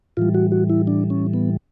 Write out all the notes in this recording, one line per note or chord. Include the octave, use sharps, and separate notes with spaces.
A2 E3 G3 F4
F#4
F#4
E4
D4
C#4
B3